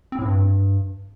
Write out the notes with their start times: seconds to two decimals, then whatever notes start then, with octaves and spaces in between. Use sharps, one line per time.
0.12 C4
0.19 A2
0.25 G2